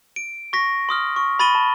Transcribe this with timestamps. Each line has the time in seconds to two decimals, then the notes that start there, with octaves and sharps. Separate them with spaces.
0.16 D7
0.53 C#6 A#6 B6
0.89 C6 D#6 F6
1.16 C#6
1.39 B5 A6 D#7 G7
1.55 A5